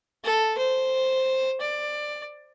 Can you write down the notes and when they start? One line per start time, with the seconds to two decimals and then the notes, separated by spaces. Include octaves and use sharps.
0.24 A4
0.58 C5
1.61 D5